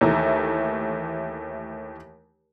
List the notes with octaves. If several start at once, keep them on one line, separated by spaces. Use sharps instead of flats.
D#2 E3 A3 A#5